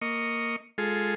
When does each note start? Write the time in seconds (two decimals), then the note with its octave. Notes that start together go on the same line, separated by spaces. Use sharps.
0.01 A#3 D#5 C#6
0.78 G#3 F4 G#4 A4